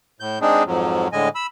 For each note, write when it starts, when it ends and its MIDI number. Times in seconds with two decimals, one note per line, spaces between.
0.20 0.39 45
0.20 0.39 91
0.41 0.63 56
0.41 0.63 60
0.41 0.63 62
0.41 0.63 63
0.41 0.63 68
0.66 1.08 41
0.66 1.08 44
0.66 1.08 53
0.66 1.08 54
1.13 1.29 45
1.13 1.29 50
1.13 1.29 56
1.13 1.29 75
1.13 1.29 80
1.35 1.47 83
1.35 1.47 88